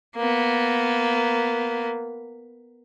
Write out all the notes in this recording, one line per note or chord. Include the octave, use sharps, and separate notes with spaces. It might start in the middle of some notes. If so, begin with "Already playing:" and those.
A#3 B3